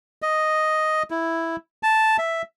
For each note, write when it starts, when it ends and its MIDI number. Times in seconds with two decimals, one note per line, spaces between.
0.22 1.03 75
1.11 1.56 64
1.83 2.17 81
2.18 2.42 76